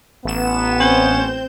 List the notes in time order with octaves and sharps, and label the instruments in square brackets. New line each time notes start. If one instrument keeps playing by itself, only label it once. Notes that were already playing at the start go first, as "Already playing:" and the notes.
[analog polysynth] A1 E7 [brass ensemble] B3
[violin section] C4 C5 G6 [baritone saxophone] C#4